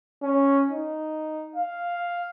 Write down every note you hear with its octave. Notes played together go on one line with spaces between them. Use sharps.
C#4
D#4
F5